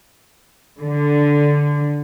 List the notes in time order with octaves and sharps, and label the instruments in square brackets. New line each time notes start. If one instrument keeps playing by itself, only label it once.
[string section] D3